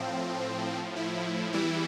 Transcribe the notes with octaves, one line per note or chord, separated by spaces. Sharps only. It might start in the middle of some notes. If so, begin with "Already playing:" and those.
Already playing: A2 F3 C4
E4
E2 E3 G3 E4